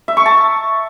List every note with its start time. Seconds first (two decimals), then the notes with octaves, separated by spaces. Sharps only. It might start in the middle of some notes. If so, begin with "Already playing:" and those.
0.08 E5
0.17 C#6
0.26 A5